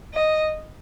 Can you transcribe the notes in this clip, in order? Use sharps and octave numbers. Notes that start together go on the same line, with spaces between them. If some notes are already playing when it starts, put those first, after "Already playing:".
D#5